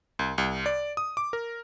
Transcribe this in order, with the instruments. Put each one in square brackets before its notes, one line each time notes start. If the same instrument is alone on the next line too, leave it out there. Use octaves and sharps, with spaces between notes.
[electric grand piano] C2
C2
D5
D#6
D6
A#4